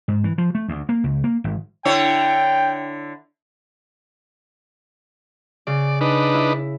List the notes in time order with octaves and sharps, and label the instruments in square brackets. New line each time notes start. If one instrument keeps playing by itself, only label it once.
[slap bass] G#2
E3
F3
A3
D2
A#3
C#2
A#3
G#1
[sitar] D3 E4 C#5 [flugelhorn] G5
[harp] C#3 [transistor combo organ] D5
[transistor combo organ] D4 D#4 B4
[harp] E4